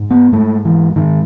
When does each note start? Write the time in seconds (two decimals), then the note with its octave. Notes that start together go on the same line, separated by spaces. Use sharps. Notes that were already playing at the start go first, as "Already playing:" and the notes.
Already playing: G#2
0.11 B3
0.32 G#2 A3
0.65 E3
0.96 G#2 D#3